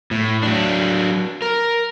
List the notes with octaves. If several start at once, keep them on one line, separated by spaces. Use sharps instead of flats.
A2
F#3 D4
A#4